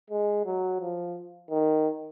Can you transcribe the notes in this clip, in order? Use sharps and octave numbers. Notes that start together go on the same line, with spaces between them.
G#3
F#3
F3
D#3